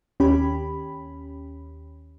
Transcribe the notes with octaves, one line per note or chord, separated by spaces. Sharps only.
D#2 C#4 G4 B5